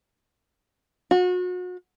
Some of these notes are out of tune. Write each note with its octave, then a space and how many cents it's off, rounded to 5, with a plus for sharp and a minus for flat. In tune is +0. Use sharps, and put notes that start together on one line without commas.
F#4 -35